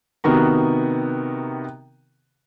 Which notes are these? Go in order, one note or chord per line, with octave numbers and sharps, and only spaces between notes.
C3 D#3 B3 D#4 F#4 A#4